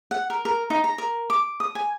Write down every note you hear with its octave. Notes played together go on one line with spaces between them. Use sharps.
F#5
A#4
A#4
D#4
A#5
A#4
D6
D#6
G#5